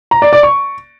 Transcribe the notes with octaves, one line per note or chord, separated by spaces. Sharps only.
A#5
D5
D5
C#6